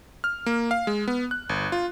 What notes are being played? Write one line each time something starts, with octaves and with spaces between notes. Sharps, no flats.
F6
A#3
F5
G#3
B3
F#6
G1
F4